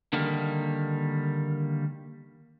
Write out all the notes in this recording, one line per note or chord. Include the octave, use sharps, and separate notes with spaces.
D3 D#3 G3 A#3